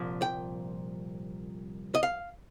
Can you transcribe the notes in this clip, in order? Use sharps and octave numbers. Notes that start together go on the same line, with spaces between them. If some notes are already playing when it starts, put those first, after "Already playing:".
Already playing: C2 A#2 F3
G5
D#5
F5